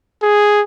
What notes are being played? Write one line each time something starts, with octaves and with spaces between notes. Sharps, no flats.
G#4